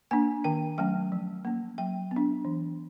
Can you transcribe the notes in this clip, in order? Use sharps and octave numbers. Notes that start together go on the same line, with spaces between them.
A#3 D4 G#5
D#3 G5
F#3 A3 C#4 G5
F3
A#3 C#4
F#3 G5
B3
D4
E3